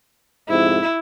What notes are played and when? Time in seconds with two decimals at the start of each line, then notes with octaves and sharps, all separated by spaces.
0.49 F2 G#2 C3 E4